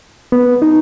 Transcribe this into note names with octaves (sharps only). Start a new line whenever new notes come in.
B3
D#4